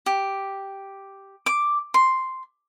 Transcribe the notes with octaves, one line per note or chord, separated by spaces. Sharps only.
G4
D6
C6